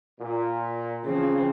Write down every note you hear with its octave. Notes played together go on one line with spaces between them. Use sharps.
A#2
C#3 E3 F3 C4